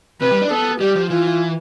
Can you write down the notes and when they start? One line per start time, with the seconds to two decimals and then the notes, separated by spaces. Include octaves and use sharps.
0.21 C3 B4
0.31 G3
0.42 D4
0.51 B3 A4
0.80 G3 G4
0.95 F3
1.10 E3 F4